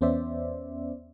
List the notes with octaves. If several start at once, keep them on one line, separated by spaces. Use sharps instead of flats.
E2 B3 C#4 C5 D5 E5